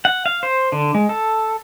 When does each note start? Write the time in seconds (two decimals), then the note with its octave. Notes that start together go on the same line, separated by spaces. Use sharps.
0.05 F#5
0.26 F5
0.43 C5
0.72 D3
0.95 G#3
1.09 A4